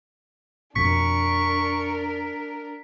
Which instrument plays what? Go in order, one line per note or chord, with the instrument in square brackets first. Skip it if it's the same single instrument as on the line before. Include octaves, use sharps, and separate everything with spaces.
[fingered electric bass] F2 B2 [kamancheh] D4 A#4 [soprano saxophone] C#6 [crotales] B6